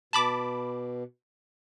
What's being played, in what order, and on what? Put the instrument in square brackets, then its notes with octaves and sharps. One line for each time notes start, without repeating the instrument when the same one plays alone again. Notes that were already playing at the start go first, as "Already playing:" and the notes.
[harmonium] B2 [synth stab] A5 B5 D6